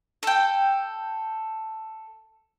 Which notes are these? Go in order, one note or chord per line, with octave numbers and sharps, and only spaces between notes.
A4 G5